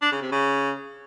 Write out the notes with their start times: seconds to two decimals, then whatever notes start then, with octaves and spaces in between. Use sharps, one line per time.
0.02 D4
0.12 C#3
0.22 C3
0.32 C#3